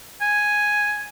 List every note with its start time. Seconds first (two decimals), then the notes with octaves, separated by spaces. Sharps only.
0.21 G#5